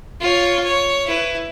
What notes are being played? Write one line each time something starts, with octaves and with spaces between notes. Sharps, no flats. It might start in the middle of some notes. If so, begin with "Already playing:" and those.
F4 C#5
C#5
E4 B4